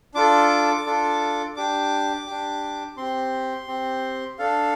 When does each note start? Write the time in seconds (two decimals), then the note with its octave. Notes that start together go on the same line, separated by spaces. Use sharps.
0.14 D4 F4 A4 D6
0.86 D4 F4 A4
1.56 D4 G4 D6
2.27 D4 G4
2.97 C4 G4 C6
3.67 C4 G4
4.39 D4 A4 F5